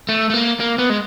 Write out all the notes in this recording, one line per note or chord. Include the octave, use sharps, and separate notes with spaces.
A3
A3
A#3
A#3
B3
G#3